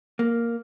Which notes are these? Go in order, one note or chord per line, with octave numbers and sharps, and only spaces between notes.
A#3